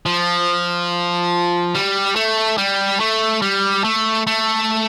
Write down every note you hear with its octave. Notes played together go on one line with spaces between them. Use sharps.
F3
G3
A3
G3
A3
G3
A3
A3